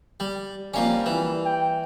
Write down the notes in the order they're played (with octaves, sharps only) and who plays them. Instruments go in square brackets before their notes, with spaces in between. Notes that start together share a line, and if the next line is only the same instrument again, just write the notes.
[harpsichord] G3
[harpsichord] F2 A#3 C#4 [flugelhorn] G3
[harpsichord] E3
[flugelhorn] G5